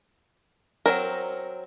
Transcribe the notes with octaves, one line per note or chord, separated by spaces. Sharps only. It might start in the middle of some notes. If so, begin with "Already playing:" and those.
F#3 G#3 C4 A#4